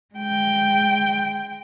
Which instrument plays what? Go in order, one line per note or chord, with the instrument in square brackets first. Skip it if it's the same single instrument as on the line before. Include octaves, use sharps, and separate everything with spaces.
[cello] G#3 G5